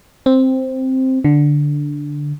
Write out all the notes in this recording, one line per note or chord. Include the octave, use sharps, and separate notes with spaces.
C4
D3